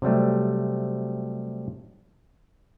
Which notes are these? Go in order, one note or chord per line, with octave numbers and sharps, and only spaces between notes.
C3 F#3 G3 A3